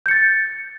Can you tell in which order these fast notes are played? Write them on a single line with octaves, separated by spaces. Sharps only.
G6 C#7 A6